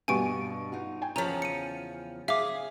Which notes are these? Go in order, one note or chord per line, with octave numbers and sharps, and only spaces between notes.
G2 B2 B3 G4 G#5 C#6 D7
D#4 F4 F#4
G5 G#5
E2 C#3 F3 C#5 A#5
C#7 D#7
G#4 E5 F5 D6